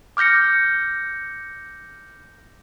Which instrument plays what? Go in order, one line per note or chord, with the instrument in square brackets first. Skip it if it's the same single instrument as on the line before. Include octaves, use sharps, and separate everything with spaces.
[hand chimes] D6 F6 G6 A#6 C#7